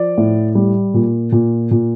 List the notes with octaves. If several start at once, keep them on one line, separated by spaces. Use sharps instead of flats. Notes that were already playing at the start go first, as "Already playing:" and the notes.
Already playing: F3 D5
A2
G3
A#2
A#2
A#2